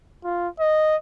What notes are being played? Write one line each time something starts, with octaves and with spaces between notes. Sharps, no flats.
F4
D#5